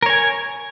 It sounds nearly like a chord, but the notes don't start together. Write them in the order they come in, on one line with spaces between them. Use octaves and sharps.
A#4 C#5 G#5